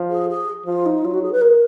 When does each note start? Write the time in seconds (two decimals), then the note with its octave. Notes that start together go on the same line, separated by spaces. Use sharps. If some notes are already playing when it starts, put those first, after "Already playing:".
Already playing: F3
0.10 G#4
0.29 G#4
0.66 F3 F4
0.85 D#4
1.04 F#3 F4
1.13 F#4
1.22 G#4
1.32 B4
1.41 A#4